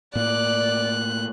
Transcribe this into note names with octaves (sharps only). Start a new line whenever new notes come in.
A2 A#3 D5 F#6